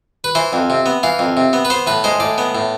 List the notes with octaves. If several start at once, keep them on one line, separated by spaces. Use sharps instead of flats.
B4
E3 C5
F2
C3
B3
E3 F5
F2
C3
B3
B4
B3 C5
A2 B4
G#3 C5
A2 D5
B3
A2